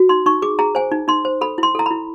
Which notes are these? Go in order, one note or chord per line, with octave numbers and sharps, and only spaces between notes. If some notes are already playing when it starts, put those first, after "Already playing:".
Already playing: F#4
D#4 C6
D#4 C#6
G#4 D6
G#4 A#5
C5 G#5
D#4
D#4 C6
C5
A4 B5
E4 C6
A4 A#5
E4 B5